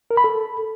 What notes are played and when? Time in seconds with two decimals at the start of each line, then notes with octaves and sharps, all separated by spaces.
0.11 A#4
0.17 B5
0.24 A4